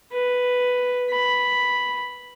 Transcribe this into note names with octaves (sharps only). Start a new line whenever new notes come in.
B4
B5